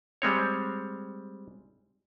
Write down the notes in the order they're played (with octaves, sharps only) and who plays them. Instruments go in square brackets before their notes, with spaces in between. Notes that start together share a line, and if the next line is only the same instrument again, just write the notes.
[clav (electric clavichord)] G3 G#3 C4 C#5